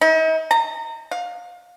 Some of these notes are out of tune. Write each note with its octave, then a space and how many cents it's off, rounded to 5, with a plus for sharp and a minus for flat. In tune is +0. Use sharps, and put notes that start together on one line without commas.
D#4 +45
A#5 -35
F5 +25